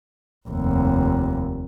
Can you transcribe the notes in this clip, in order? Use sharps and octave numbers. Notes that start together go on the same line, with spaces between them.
F1 D#2